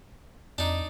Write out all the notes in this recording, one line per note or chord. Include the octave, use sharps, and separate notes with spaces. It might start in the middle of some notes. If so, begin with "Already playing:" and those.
F2 D4 D#4